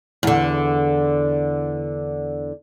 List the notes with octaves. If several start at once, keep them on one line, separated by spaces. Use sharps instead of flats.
E2 D3